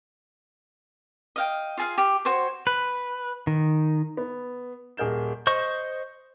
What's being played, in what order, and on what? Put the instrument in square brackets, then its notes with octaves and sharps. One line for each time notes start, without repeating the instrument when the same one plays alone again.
[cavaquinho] D#5 F5 G5
F4 G#4 F5
G4
F#4 C5 C#5
[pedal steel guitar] B4
D#3
[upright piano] B3
D#1 G#4 A#4 G6 E7
[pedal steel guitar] C5 D#5 C#6